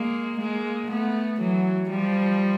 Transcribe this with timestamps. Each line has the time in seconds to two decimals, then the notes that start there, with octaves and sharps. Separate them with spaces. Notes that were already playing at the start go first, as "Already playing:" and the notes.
Already playing: G#3 A#3
0.40 G#3 A#3
0.90 A3 B3
1.40 E3 F#3
1.90 F3 G3